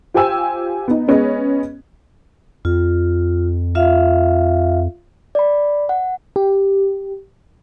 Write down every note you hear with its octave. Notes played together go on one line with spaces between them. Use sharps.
F4 G4 C5 G5 G#5 E6
B3 D#4
G#3 B3 C#4 B4 D#5
F2 F4
F4 E5 F5
D5 B5
F#5
G4